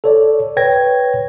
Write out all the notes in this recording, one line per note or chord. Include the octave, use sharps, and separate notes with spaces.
A4 C#5 D5
B4 C#5 G5 G#6 A#6